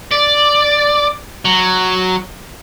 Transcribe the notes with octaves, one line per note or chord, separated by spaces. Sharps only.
D5
F#3